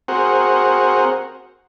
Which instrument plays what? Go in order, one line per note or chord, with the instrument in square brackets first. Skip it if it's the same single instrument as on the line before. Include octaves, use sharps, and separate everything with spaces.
[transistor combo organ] C4 F#4 G#4 A#4 C5 F#5